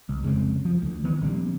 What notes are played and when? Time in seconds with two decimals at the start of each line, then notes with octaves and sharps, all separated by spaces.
0.09 C2
0.23 F1 C#3 G#3 C4
0.65 F3
0.82 D2
1.04 D#3 E3 B3
1.22 A#1 D3 G3 C4